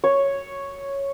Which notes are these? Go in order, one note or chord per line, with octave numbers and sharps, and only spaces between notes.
C#5